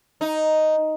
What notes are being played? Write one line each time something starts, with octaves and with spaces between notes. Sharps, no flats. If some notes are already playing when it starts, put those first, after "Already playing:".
D#4